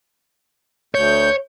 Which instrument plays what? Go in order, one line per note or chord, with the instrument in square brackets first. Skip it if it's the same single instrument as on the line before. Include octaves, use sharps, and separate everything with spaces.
[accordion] D2 G6 [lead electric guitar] C#5